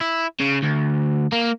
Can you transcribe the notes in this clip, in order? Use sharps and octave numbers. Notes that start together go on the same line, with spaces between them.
E4
C#3
D2
A#3